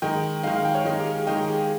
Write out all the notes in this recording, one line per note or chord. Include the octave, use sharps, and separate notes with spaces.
D#3 G#3 D#4 G5
D#3 G#3 D#4 F5
F5
G5
C#5
D#3 G#3 D#4
G4
G#4
D#3 G#3 D#4 G5
G#4
G4
G#4